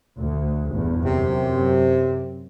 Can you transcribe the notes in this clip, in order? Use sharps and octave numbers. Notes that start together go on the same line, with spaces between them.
D2
G1 E2 G2
F#2 C3